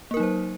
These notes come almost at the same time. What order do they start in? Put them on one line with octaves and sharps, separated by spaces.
A#3 A#4 D#4 F#3 C5